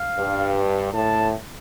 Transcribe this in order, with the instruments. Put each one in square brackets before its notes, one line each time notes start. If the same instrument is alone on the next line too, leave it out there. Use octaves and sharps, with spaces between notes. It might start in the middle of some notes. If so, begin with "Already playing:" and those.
Already playing: [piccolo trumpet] F5
[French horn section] G2
[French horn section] A2 [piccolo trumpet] A5